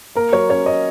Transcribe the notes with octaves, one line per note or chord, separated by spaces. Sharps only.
A#3 A#4
F#3 C#5
C#4 C#5
C#4 D#5